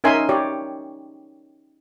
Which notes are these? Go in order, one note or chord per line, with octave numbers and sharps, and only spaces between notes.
C#4 D#4 A#4 E5 G#5 C6
G4 C#5 D5